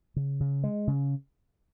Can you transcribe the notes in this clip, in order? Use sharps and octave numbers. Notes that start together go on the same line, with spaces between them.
C#3
C#3
G#3
C#3